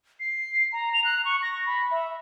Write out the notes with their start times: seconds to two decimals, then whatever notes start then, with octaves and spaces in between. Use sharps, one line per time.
0.20 C7
0.72 A#5
0.93 F7
1.05 F#6
1.25 C#6
1.42 A#6
1.66 B5
1.91 E5